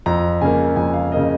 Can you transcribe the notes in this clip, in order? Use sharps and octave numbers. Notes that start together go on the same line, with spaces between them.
F2 A#5
C#3 A#3 G#5
F2 G#5
F5
C#3 A#3 D#5